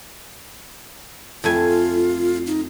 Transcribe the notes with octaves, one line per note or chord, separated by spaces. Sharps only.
F2 A3 F4 G#5
D#4